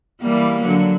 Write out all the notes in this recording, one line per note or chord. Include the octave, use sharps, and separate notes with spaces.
E3 G3 A#3
D3 F#3